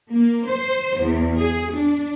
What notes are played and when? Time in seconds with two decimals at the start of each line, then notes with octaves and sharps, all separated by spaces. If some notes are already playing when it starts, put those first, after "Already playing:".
0.11 A#3
0.46 C5
1.01 E2
1.38 G#4
1.74 D4